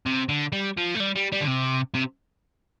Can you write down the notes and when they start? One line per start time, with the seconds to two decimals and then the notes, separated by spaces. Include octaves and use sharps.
0.06 C3
0.29 D3
0.52 G3
0.77 F3
0.95 A3
1.00 G3
1.16 G3
1.32 G3
1.41 D3
1.47 C3
1.95 C3